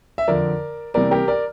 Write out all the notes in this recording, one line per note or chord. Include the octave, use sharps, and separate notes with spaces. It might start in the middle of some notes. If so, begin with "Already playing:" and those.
E5
F2 D3 F3 A#4 D5
C3 E3 G3 A#3 A#4 D5
G4 A#4
A#4 D5